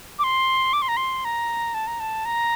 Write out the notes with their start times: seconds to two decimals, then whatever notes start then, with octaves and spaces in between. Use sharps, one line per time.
0.19 D6
0.24 C6
0.73 D6
0.82 C6
0.88 A#5
0.97 C6
1.25 A#5
1.74 A5
1.87 A#5
2.00 A5
2.25 A#5